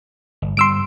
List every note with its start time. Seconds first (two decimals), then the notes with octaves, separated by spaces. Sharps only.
0.42 G1
0.57 G2 D3 G3 C6 E6 D7